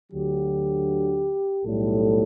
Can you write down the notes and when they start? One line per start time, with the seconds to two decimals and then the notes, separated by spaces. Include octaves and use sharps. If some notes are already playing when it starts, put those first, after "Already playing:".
0.11 D2 D3 F#3 G4
1.63 B1 A2 G3 A4